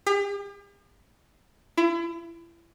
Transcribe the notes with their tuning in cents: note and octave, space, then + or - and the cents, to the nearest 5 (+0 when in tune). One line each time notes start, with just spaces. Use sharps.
G4 +45
E4 +35